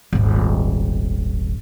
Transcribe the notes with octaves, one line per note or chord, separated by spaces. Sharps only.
D#1 G#1